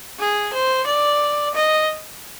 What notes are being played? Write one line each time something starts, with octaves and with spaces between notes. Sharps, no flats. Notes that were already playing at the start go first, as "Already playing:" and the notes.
G#4
C5
D5
D#5